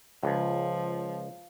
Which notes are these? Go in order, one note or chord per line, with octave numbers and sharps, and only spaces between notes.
C#2 F3